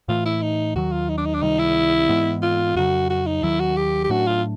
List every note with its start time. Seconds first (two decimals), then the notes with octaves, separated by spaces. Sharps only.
0.08 A2 E3 A3 F4
0.25 E4
0.42 D#4
0.75 D#2 D#3 F#3 F#4
0.92 F4
1.09 D#4
1.17 D4
1.26 D#4
1.34 D4
1.42 C#2 C3 D#3 G3 D#4
1.59 E4
2.09 G#2 E3 G#3 B3
2.42 F4
2.76 F2 C#3 F#3 F#4
3.10 F#4
3.26 D#4
3.42 D#2 D#3 F#3 E4
3.60 F#4
3.77 G4
4.04 G4
4.09 A2 F#3 A3 D4 F#4
4.27 F4